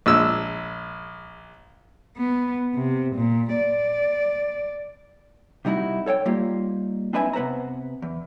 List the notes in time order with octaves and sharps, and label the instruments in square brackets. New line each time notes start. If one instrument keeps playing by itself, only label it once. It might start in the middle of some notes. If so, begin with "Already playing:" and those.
[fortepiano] A#1 G#3 E6
[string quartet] B3
C3
A#2
D5
[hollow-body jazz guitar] C3 G3 D#4 E4 F#4
A4 C#5 F5 G5
G3 A#3 D#4 F4 G4
C4 D4 D#4 B4 E5 G#5
C3 B3 B4 C5 A#5
E2